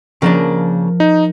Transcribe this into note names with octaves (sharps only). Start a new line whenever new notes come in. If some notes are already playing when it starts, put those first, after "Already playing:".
C#3 F3 A#3 D4 A#4
D#4